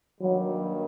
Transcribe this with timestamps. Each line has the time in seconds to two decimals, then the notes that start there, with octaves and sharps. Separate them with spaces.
0.21 G2 D#3 F#3 G3 A#3